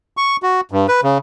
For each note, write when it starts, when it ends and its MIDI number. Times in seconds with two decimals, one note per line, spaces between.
0.17 0.37 85
0.43 0.61 66
0.72 0.87 43
0.88 1.01 71
1.04 1.18 49